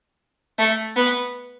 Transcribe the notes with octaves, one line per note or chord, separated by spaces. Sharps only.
A3
B3